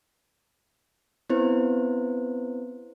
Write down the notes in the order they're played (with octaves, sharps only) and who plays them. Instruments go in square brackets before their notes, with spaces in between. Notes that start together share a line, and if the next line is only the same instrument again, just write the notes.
[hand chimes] B3 C4 E4 B4 C5